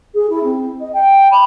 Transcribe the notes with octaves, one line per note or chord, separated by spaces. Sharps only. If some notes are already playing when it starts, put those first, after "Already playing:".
G#4
E4
C4
D#5
G5
B5